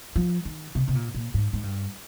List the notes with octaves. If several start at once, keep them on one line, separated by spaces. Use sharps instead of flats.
F3
D#3
C3
C3
A#2
A#2
G#2
G#2
G2